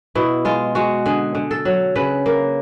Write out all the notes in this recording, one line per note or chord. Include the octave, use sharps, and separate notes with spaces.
B2 E4
G#3 F4
G#3 F#4
D3 G#4
D3
A4
F#3
C#3 B4
A#3